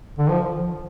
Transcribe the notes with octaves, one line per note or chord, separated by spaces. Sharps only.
D3
F3